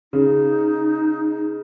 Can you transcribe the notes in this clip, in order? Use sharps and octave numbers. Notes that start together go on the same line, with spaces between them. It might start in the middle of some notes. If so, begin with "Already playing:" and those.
C#3 D#4